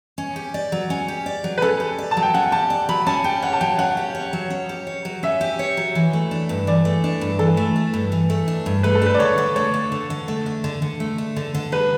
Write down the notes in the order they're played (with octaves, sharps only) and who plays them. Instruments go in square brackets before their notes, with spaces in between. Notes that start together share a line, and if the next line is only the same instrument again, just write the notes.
[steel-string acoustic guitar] C#4
G4
D5
F#3
C#4
G4
D5
F#3
[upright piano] B4
[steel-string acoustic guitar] C#4 [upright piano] A4
[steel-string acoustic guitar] G4
D5
[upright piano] A5
[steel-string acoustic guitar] F#3
[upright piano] G5
[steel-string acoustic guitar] C#4 [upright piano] F#5
[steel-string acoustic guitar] G4 [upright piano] A5
[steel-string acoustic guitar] D5
[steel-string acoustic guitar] F#3 [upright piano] B5
[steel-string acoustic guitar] C#4 [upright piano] A5
[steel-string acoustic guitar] G4 [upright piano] G5
[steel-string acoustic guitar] C#5 [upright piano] F#5
[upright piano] A5
[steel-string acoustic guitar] F#3 [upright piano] G5
[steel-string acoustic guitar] C#4 [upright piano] F#5
[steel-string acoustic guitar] G4
C#5
F#3
C#4
G4
C#5
F#3
[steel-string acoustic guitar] C#4 [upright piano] E5
[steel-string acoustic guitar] G4
C#5
F#3
E3
A3
D4
G2
[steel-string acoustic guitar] E3 [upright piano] D5
[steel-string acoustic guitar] A3
D4
G2
[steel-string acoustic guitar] E3 [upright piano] A4
[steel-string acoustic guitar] A3
D4
G2
E3
A3
D4
G2
[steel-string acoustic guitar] A3 [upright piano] B4
[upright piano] A4
[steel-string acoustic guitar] D4 [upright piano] B4
[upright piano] D5
[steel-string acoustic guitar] D3 [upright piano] C#5
[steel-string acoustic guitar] D3
[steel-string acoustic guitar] A3 [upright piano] C#5
[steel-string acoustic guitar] D4
D3
D3
A3
D4
D3
D3
A3
D4
D3
D3
[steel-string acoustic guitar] G3 [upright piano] B4